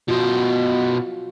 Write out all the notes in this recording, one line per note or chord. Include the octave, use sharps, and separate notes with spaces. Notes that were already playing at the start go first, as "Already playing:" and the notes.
B2 F4 F#4 C5